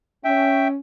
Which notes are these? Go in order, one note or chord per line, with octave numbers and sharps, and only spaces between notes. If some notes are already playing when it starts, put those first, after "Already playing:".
C#4 E5 G5